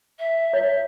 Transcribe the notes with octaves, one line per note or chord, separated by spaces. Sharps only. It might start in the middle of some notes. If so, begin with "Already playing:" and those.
E5
C#5